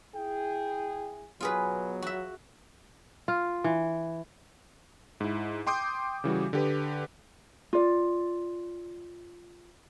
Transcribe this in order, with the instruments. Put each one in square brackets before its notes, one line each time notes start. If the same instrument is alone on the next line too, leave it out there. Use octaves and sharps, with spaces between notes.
[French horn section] E4 G#4 [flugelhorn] G5
[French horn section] B2 B3 [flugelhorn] F#3 [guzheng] F4 G#4 B4
[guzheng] F#4 E5
[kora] F4
E3
[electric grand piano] G#2 E4
G5 C6 D6 D#6 G6
C#3 E3 G3 F#4
D3 G4 B4
[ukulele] F4 D5